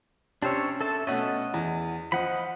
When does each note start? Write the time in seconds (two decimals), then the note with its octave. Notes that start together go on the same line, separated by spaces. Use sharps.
0.42 C3 C#4 D4 C5 C#5 E6
0.81 A4 E5 A5
1.07 B2 A3 C#4 D#5 F#5
1.54 E2
2.12 F3 D#5 F#5 B5